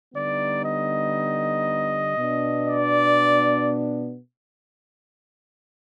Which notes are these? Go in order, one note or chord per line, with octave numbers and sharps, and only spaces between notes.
D3 G3 B3 D#4 D5
D#5
B2 B3 D4
D5